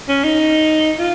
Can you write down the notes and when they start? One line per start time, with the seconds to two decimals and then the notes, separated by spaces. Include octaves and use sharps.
0.09 C#4
0.24 D#4
0.99 F4